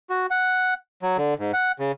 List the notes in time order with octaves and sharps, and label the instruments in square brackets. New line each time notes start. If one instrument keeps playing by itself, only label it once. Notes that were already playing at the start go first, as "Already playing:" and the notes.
[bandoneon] F#4
F#5
F#3
D3
G#2
F#5
C#3